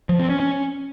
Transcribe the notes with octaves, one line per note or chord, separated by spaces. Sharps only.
F3
C4
C#4
C#4